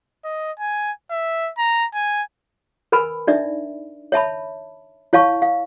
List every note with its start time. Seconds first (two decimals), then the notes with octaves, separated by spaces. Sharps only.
0.24 D#5
0.59 G#5
1.11 E5
1.57 A#5
1.94 G#5
2.92 A#4 B4 G#5 B5
3.27 D4 D#4 D5 E5
4.12 C#5 E5 A5 B5
5.13 E4 C#5 F5 A5 C#6
5.42 F5